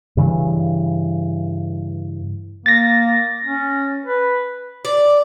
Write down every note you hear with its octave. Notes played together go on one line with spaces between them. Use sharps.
G2 C#3 E3
A#3 A6 A#6
C#4
B4
D5